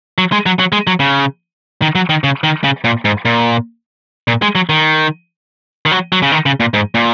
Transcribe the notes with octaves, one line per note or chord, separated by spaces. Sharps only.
F#3
G#3
F#3
F#3
G#3
F#3
C#3
D#3
F#3
D#3
C#3
D#3
C#3
A#2
G#2
A#2
A#2
G#3
F#3
D#3
D#3
F#3
F#3
C#3
D#3
C#3
A#2
G#2
A#2